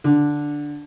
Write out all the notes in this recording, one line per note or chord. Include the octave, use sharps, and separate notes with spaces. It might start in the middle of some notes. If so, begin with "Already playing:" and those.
D3